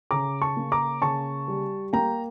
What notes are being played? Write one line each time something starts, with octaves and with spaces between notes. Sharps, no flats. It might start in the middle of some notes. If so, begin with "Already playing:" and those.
C#3 A#5 D6
A5 C#6
A#3
A#5 D6
C#3 A5 C#6
G3
A#3 G5 A#5